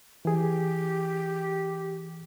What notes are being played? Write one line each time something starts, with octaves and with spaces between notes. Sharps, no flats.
E3 G4 G#4